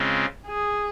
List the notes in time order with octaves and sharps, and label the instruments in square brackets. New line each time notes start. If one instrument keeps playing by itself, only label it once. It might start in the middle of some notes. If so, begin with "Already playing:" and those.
Already playing: [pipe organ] C#3 G#3 C4 F4
[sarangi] G#4